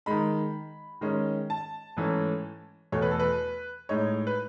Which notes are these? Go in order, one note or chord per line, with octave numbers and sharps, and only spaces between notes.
D#3 G#3 D#4 B5
D#3 G#3 C#4
A5
G#2 E3 A3 C#4
E2 B2 A3 C#5
B4
A4
B4
A2 G#3 D#4 C#5
B4